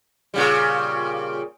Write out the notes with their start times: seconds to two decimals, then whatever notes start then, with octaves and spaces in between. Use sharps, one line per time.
0.34 A#2 C#3 G3